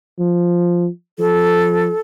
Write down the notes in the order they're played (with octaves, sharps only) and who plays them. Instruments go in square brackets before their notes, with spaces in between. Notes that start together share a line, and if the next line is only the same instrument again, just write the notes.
[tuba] F3
[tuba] F3 [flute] A4